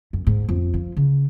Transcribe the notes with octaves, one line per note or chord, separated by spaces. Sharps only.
F#2
G#2
F2
F3
C#3